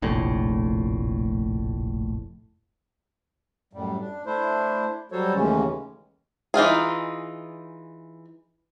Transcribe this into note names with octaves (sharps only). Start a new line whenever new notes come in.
F1 A#1 A2
F#2 A2 G3
D4
A3 D4 E4 C5
F#3 G3 F#4 A4 C5 C#5
D#2 A2 C#3 E3 G#3 C#4
E3 D#4 F4 G#4